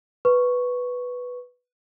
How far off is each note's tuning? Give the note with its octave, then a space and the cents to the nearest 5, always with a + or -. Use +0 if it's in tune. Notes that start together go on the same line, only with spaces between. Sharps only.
B4 +0 C#6 +0